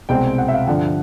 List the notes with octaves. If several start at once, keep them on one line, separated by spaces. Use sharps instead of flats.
C2 B2 G#3 C4 G5
F#5
E5
F5
G2 D3 F3 F#5